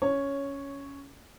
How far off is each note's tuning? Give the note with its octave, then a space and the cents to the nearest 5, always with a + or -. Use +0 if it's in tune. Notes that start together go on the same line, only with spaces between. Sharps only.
C#4 +10 C#5 +0